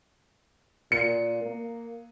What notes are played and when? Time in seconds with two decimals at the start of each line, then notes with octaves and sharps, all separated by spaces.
0.92 A#2 C#7
1.43 A#3